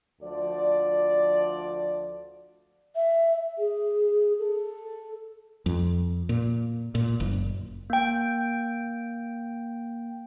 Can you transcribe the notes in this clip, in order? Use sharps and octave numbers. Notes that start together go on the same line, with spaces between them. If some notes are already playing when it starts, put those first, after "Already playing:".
D2 F3 D5
E5
G#4
A4
F2
A#2
A#2
F#1
A#3 G5